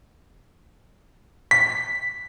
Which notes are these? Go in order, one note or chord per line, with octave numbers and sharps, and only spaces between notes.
B6